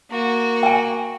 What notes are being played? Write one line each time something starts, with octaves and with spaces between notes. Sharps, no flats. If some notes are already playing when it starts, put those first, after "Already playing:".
A#3 F#4
G5 G#5